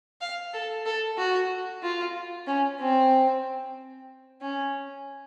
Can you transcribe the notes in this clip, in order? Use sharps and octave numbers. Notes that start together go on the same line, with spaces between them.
F5
A4
A4
F#4
F4
C#4
C4
C#4